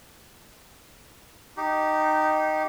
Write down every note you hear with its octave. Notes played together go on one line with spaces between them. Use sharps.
D#4 G4